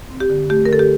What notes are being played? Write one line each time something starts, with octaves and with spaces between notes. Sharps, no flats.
C4
G4
D3
A3 G4
A#4
D3 A4
G4